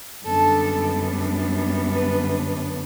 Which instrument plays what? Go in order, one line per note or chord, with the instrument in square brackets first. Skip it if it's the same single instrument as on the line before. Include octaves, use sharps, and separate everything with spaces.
[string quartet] F#2 D3 G3 B3 D4 A4
B4